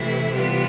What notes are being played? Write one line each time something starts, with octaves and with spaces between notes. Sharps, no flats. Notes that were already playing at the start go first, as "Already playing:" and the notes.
Already playing: C3 E3 A3 E4
C3 E3 G3 B3 F4